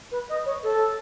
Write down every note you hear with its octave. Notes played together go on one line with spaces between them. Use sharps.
B4
D#5
C#5
A4